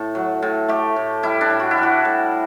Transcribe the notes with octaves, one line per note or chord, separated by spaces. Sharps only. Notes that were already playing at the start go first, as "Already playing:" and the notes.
Already playing: A2 A4
F#3
A2
A3 G4
A2
G3 E4
D4
A2
F#4
E4
G3
F#4
A2